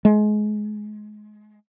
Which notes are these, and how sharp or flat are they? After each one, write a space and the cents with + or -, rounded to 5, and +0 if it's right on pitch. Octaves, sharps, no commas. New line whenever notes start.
G#3 +25